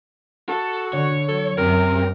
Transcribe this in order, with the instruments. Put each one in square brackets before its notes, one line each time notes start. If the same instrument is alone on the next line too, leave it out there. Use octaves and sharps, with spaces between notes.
[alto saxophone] F#4 [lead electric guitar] A4
[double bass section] D3 [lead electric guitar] C#5
[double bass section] F#3 [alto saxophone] A4
[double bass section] F#2 [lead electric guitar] C3 [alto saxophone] A#4